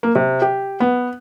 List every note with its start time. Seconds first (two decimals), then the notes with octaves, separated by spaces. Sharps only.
0.03 A#3
0.15 C3
0.42 G4
0.80 B3